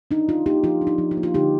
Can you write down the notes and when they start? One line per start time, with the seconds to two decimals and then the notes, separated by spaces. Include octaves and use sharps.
0.11 D4 D#4
0.28 F3 F4
0.46 A#3 D#4 G4
0.64 F3 F4
0.81 D4
0.87 D#4
0.98 F3
1.11 F4
1.17 A#3
1.23 F4
1.34 D3 D#4 G4